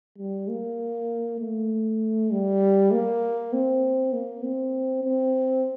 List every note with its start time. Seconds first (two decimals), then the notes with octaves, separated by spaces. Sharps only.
0.18 G3
0.49 A#3
1.39 A3
2.31 G3
2.92 A#3
3.53 C4
4.13 A#3
4.43 C4
5.04 C4